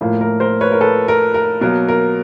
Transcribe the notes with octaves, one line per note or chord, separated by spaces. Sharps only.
A2 F3 A#3
A#4
A#4 C5
B4 C#5
A#4
A4 B4
A#4
A#4
B2 F#3 A#3 A#4
A#4